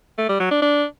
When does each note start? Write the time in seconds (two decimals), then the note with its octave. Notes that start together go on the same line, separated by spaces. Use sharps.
0.18 A3
0.29 G3
0.40 F#3
0.51 D4
0.62 D4